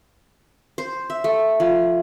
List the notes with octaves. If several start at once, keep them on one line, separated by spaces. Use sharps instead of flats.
C5
E5
A3
F3